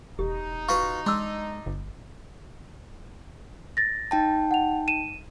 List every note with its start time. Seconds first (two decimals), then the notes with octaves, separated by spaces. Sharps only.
0.19 E1 D#4 G4
0.69 F4 F#4 B4 C#6
1.06 G#3 D4 C6 E6
1.66 G1
3.77 A6 A#6
4.11 D#4 G5 A5
4.51 F#5 F7
4.88 D#7 E7